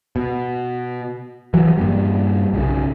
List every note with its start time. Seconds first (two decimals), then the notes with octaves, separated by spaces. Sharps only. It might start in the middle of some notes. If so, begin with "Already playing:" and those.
0.16 B2
1.54 E3 F#3
1.78 G2 A#2 G3
2.54 B1 C#3